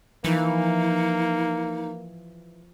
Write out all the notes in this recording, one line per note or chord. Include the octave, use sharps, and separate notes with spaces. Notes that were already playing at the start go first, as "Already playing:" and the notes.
E3 F3 A#3 D#4